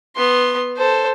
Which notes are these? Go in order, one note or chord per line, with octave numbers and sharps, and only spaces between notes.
B3 C6
A4 C5